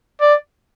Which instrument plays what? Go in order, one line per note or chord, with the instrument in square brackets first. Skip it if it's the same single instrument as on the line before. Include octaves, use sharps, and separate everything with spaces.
[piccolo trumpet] D5